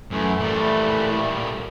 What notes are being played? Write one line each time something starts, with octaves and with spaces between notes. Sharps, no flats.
F#2 E3 A3
A#2 G3